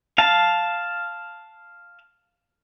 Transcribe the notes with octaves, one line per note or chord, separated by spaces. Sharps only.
F5 A5